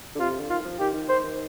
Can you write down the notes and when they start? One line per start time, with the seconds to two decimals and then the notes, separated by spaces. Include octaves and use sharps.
0.15 D3
0.20 C3 F4
0.40 D3
0.49 D#3 F4
0.65 F3
0.79 D#3 G4
0.93 D#3
1.09 D#3 C5
1.24 D#3